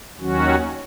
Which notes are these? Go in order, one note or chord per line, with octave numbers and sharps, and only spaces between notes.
D#2 D#3 F#3 C#4 F#4